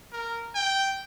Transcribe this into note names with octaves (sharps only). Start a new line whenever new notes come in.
A#4
G5